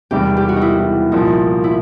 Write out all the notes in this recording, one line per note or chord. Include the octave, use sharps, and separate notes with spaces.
E1 E2 C3 D#3 G3 G4
G4
F#4
D#4
E4
C2 A#2 F3 D#4
E4